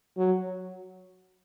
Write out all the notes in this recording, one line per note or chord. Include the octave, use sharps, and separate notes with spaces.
F#3